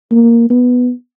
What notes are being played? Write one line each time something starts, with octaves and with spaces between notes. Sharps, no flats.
A#3
B3